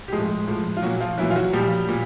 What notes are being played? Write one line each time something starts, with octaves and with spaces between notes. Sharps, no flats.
G4
A2 F3 G#3 G#4
A2 F3
F4
A#2 F#3 F#4
F3 F4
A#2 E3 F#3 E4
F4
F#3 F#4
A#2 F3 G3 G4
A#2